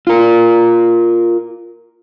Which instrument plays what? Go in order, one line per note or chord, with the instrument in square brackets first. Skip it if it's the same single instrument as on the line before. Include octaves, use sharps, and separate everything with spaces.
[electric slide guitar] F4 A#4